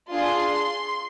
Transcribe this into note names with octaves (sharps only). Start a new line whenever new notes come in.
D4 F4 G#4 C6